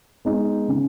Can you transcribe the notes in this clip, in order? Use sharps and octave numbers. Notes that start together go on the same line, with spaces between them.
G#3 B3 D#4
C#3